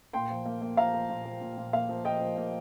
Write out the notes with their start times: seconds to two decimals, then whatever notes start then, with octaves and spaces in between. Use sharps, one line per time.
0.13 A#2 G5 C6
0.30 F3
0.46 A#3
0.62 A#3
0.77 F3 F5 A#5
0.94 F3
1.10 A#2
1.25 F3
1.41 A#2
1.57 A#2
1.73 A#3 F5
1.89 F3
2.05 F3 D#5 G5
2.21 F3
2.37 A#3